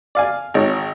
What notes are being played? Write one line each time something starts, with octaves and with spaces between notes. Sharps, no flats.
D5 F5 G#5
G#1 D#4 C#5